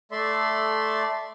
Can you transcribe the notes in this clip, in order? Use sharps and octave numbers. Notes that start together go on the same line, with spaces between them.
A3 A4 D5 E5 C6